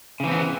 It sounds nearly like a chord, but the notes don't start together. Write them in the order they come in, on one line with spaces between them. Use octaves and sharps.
C#3 E3 C4 B3